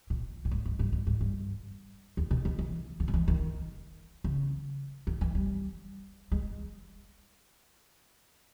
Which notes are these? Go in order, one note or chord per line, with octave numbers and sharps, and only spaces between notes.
A#2
A#2
G#2
G2
G2
G2
G#2
G2
E2
B2
D#3
E3
D#3
G3
E3
D#3
C#3
D#3
E3
G3
G#3